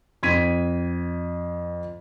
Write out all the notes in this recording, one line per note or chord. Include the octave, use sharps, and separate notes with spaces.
F2 G#6 B6 D#7